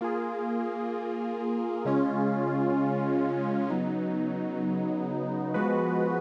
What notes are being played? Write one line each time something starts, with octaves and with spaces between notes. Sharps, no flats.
A#3 F4 G#4
C#3 G#3 C#4 F4
C#3 F#3 B3 D#4
F3 G#3 B3 F#4 B4